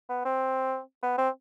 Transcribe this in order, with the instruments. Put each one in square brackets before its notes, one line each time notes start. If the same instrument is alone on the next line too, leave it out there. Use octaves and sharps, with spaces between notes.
[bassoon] B3
C4
B3
C4